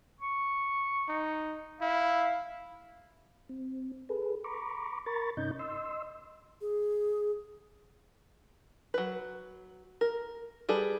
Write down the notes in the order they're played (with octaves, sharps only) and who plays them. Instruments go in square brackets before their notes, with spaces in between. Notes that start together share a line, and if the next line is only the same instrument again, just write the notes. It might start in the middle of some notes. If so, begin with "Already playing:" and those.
[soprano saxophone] C#6
[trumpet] D#4
[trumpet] E4 [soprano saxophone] F5
[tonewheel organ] C4
G#4 A4 B4
A#5 B5 C#6 D6
A#4 A#5 B5 C#6 A6
G2 C3 C#4 D#4 D#5 G6
D#5 C6 E6
[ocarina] G#4
[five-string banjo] F#3 B4
A#4
G3 G#4 A4 B4